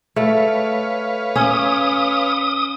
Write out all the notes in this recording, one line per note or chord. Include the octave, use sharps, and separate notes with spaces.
A3 B4 C#5 F5
C#4 D#6